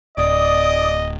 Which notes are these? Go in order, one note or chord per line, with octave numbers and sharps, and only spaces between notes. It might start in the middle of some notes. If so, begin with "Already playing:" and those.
D1 D5 D#5 D#6